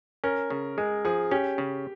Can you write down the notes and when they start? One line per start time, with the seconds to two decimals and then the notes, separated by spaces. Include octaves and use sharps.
0.24 C#4 A#4
0.50 C#3
0.78 G#3 G#4
1.05 F3 G#4
1.31 C#4 G4
1.58 C#3